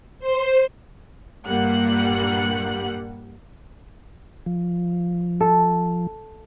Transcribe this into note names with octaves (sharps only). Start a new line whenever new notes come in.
C5
G2 A#2 G3 A#3 F#5 F#6
F3
A4